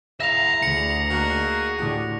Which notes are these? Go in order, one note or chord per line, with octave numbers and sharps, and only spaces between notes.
C#3 E4 E5 F5 A#5 A#6 F7
D2 D3 G#4 C#7
A#3 D#4 F#4
A2 D3 F#4 G4